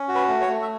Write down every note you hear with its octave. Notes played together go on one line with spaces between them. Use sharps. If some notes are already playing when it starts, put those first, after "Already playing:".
Already playing: C#4
F#4
B4
A3
C#5
A3
E5